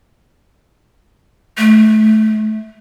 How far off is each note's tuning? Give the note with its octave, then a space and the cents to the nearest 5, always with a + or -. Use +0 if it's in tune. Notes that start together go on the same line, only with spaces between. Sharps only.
A3 -20